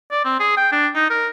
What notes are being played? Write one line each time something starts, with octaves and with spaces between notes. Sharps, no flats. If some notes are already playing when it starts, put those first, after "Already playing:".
D5
C4
G#4
G5
D4
D#4
A#4